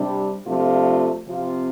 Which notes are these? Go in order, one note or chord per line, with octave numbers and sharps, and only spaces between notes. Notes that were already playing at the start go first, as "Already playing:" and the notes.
Already playing: C3 G3 D4
C3 F3 A3 D4 F4
C3 F3 C4 F4